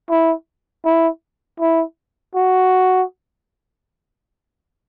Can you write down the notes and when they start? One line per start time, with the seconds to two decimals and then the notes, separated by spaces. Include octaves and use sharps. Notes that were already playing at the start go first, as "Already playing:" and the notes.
0.10 E4
0.85 E4
1.60 E4
2.35 F#4